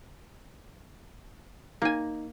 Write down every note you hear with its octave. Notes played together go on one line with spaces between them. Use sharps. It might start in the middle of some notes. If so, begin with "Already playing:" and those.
A#3 D#4 G#5